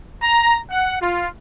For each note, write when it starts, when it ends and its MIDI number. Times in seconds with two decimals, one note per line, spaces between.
0.24 0.57 82
0.71 1.00 78
1.01 1.27 65